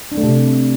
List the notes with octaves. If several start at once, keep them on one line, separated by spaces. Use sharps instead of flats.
D4
A3
C3